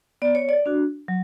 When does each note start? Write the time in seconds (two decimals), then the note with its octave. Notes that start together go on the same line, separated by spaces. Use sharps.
0.22 B3 D5
0.35 C#5
0.49 D5
0.66 D4 F#4
1.08 F#3